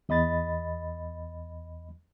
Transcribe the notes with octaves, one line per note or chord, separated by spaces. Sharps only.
E2 D#5 B5 A6